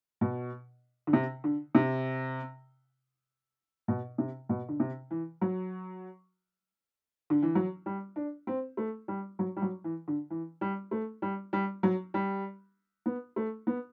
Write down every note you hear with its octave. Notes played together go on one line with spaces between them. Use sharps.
B2
D3
C3
D3
C3
B2
C3
B2
D3
C3
E3
F#3
D3
E3
F#3
G3
D4
C4
A3
G3
F#3
G3
F#3
E3
D3
E3
G3
A3
G3
G3
F#3
G3
B3
A3
B3